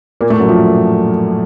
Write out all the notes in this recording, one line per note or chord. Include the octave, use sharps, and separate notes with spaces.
A#2 A#3
A2 A3
F#2 F#3
F3